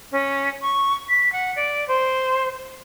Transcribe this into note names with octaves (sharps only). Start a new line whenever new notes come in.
C#4
C#6
B6
F#5
D5
C5